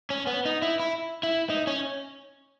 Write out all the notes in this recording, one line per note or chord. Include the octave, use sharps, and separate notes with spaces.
C#4
B3
D#4
E4
E4
E4
D#4
C#4